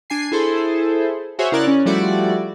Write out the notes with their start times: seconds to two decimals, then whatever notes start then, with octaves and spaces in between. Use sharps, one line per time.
0.10 D4 G#5 C7
0.32 E4 G#4 A4 C5
1.39 F#4 G#4 C5 C#5 E5
1.52 C#3 E4 A#4 D5 F#6
1.67 C#4
1.85 F3 G3 A3 E4 F#4 D5